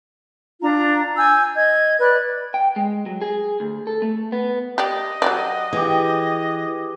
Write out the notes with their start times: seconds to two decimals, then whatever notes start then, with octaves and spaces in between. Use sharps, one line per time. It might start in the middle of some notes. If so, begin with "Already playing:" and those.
0.60 D4 F4 A#5
1.17 G#5 E6 G6
1.55 D#5 G#6
2.00 B4 D5 F#6
2.54 G5
2.76 G#3
3.06 F#3
3.22 G#4
3.60 D2
3.87 A4
4.02 A3
4.32 B3
4.78 G4 D5 D#5
5.22 F#3 G3 D5
5.73 E3 G4 G#4